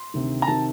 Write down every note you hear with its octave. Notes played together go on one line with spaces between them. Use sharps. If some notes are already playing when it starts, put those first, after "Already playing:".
Already playing: C6
D2 C3 D#3
A#5
C3 D#3 A5